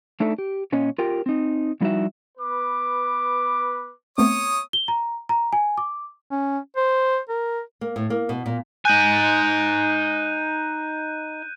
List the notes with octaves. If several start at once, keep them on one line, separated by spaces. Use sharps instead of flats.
A3 D4 D#4 A4 E5
G4
A#2 C#4 C#5 D#5
F4 G4 A#4 G5
C4 D#4
F3 G3 D#4 E4 F#4 E5
B3 B4 D6
A3 B3 C4 C#5 D#6
G7
A#5
A#5
G#5
D6
C#4
C5
A#4
A#3
A2
A#3
B2
A#2
D#4 G#5 F#6 G6 D#7